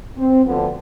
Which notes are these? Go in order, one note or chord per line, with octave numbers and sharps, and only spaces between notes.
C4
D2 D3 F3 B3